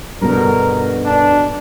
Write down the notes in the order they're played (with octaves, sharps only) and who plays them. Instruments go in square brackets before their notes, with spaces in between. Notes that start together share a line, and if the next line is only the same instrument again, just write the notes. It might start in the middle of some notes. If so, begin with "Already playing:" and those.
[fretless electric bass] G2 B2 D3 [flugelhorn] A#4
[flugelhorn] D4